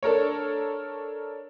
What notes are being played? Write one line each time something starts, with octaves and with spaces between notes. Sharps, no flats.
D4 A4 A#4 C#5